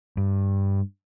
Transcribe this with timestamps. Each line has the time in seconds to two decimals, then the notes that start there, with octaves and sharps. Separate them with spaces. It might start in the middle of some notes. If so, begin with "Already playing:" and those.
0.17 G2